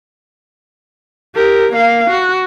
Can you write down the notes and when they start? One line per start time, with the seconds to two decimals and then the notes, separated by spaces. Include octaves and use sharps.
1.35 G4 A#4
1.73 A#3 F5
2.11 F#4